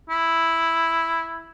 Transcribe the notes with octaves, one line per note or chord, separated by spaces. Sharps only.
E4